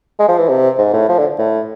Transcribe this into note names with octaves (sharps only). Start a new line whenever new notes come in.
G#3
F3
E3
C3
G#2
A2
F3
D3
A2